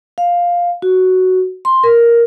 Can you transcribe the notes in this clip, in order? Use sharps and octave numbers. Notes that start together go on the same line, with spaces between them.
F5
F#4
C6
A#4